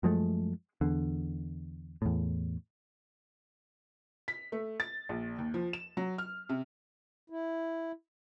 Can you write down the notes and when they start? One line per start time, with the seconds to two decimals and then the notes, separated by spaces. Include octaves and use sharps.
0.03 F#2 F3 G#3 A3
0.81 E2 D3
2.02 E2 A2
4.28 B6
4.52 A3
4.80 A6
5.09 A#1
5.38 D#2
5.54 F3
5.73 E7
5.97 F#3
6.18 F6
6.49 C3
7.30 E4